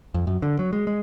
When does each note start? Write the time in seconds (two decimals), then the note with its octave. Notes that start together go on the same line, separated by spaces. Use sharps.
0.14 F2
0.27 F#2
0.42 D3
0.59 F#3
0.73 G#3
0.87 G#3